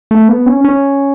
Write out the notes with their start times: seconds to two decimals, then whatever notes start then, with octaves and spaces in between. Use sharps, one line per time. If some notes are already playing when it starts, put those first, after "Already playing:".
0.11 A3
0.28 B3
0.46 C#4
0.65 C#4